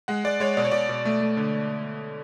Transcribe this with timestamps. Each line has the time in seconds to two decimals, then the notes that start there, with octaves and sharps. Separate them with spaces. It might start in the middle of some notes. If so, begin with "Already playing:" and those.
0.08 G#3 F#5
0.24 G#3 D5
0.40 G#3 C#5
0.57 B2 D5
0.65 C#5
0.72 B2 D5
0.89 B2
1.05 A3
1.21 A3
1.37 D3